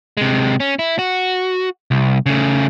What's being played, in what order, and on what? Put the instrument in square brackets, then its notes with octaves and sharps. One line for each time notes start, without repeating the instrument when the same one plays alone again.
[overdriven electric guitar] C3 G#3
C#4
E4
F#4
C2
C#3 A3